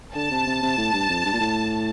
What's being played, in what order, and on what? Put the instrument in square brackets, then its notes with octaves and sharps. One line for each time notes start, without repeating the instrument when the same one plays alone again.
[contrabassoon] D3 [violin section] A5
[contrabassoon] C3
C3
C3
A2
G2
F2
G2
A#2
A2